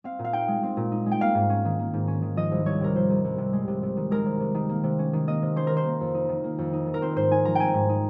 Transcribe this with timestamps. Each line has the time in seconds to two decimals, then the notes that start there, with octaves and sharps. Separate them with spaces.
0.04 C4 F5
0.19 A#2
0.24 F5
0.33 D#4 G5
0.48 G#3
0.63 C4
0.77 A#2
0.92 D#4
1.06 G#3
1.12 G5
1.21 A#3 F5
1.35 G#2
1.50 C#4
1.65 D#3
1.79 A#3
1.93 G#2
2.08 C#4
2.22 D#3
2.37 F3 D#5
2.52 C2
2.66 C2 C#5
2.81 C3 A#4
2.95 F3 C5
3.10 C2
3.24 C2
3.38 C3
3.53 G#3
3.68 C3
3.83 C3
3.97 D#3
4.11 G#3 A#4
4.26 C3
4.40 C3
4.55 D#3
4.69 A#3
4.84 C3
4.99 C#4
5.13 D#3
5.27 A#3 D#5
5.42 C3
5.56 C#4 C5
5.67 D#3 A#4
5.77 C5
5.85 A#3
6.01 F2
6.15 D#4
6.29 D#3
6.44 A#3
6.58 F2
6.73 D#4
6.87 D#3
6.94 A#4
7.02 C4 C5
7.16 G#2 C5
7.31 D#4 G#5
7.45 F3 A#5
7.55 C4 G5 G#5
7.74 G#2
7.89 D#4